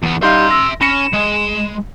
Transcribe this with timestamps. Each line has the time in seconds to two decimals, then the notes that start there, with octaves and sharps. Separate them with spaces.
0.03 E2 B3
0.23 G3 D#4 E5 F5 C6 G6
0.51 E6 A#6
0.81 C#4 B5 A#6 C#7 E7
1.13 G#3